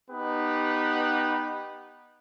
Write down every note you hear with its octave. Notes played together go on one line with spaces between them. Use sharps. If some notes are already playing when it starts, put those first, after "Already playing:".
B3 D#4 G4 B4